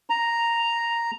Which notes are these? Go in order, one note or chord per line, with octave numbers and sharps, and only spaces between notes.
A#5